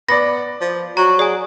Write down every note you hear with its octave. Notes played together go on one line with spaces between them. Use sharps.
B3 D5 B5 A#6
F3
F#3 F#4 A#5
G#4 D5 G#5